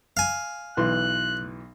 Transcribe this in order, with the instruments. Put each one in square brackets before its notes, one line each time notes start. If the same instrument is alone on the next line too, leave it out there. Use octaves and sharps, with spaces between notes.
[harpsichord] F5 G#5
[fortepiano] B1 E3 C6 [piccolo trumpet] F#6